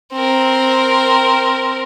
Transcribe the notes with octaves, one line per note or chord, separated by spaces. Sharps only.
C4 A#4